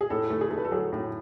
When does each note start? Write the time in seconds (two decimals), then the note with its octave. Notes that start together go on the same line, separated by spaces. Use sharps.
0.01 G#4
0.10 A2 A4
0.30 A3
0.41 G#4
0.51 A3
0.58 B4
0.65 A4
0.71 F#3 G#4
0.92 A2